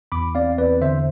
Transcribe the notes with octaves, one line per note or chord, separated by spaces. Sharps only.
E2 B5 D6
C4 D5 F5
E2 B4 D5
D3 C5 E5